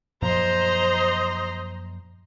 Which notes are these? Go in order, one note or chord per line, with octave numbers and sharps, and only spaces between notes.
F#2 A#2 F3 C5 D#5 A#5 C6